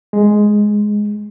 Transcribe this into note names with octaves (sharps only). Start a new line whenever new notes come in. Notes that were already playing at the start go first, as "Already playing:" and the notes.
G#3